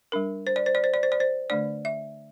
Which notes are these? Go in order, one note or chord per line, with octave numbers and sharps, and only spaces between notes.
G3 D4 A#4
C5
D5
C5
D5
C5
D5
C5
D5
C5
D3 A3 D4 D5
E5